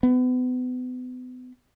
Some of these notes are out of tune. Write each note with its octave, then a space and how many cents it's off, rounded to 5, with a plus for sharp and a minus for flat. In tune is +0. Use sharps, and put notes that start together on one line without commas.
B3 +35